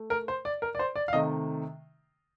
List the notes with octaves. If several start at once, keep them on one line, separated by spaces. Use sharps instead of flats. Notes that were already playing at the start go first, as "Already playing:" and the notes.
Already playing: A3
A#4
C5
D5
A#4
D5
C5
D5
F5
C3 D#3 A3 D#5